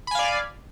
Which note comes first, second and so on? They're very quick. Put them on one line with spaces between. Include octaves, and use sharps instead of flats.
B5 G#5 F5 D5